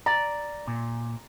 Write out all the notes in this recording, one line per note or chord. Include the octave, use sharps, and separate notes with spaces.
D5 A#5
A#2